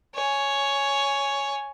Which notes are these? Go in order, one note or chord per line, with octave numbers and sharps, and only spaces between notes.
C#5 G#5